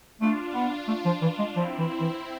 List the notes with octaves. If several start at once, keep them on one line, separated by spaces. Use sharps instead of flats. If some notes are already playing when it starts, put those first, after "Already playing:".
A3 D4 F4
B3
A3
F3
E3
G#3
F3 C4 E4
E3
C4 E4
E3